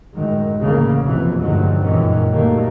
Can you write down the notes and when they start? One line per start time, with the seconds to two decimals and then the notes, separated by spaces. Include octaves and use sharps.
0.15 F#2 A2 D#3 F#3 G#3
0.59 A1 D2 A2 C#3 E3 A#3
1.04 F#1 B1 F2 C3 E3
1.41 D2 G2 D#3 F#3 G#3
1.81 C#2 F#2 A#2 D#3 E3 C#4
2.31 A#2 D#3 F#3 G3 A3 A#3